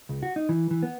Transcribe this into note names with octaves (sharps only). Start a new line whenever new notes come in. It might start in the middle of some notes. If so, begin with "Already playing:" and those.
C#2
F#4
D#4
E3
E3
B3